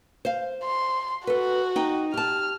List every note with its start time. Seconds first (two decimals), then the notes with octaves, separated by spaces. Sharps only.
0.25 C5 F5
0.64 C6
1.27 F#4 A4 B4
1.76 D#4 G5
2.14 G4 A5 F6